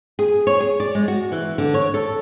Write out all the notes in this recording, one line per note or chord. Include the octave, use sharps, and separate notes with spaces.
G#4
C#5
G#4
D5
G#3
F#4
E3
D3
C#5
A4